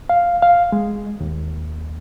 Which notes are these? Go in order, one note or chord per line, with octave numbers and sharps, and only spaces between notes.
F5
F5
G#3
D#2